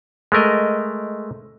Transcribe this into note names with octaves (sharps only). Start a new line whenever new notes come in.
G#3 A3 A#4 D#5